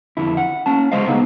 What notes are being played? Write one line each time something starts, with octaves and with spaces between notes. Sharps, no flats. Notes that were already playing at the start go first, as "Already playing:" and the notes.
F2 D3 E4
F#5
A#3 C#4 A5
C#2 G#3 C5 D#5 F5
C#3 B3 D#4